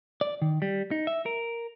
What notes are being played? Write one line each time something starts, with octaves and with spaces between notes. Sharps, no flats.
D5
D#3
G3
D#4
E5
A#4